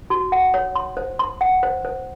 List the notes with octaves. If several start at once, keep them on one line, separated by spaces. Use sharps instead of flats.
F#4
F#5
C#5
C6
C5
C6
F#5
C5
C5